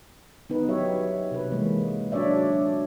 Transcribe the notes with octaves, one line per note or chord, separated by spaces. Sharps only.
B3 D#4 B4
F#3 G4 C#5 E5
C3 B4
E3 G#3 A#3
F#3 D4 F#4 C#5 D5 E5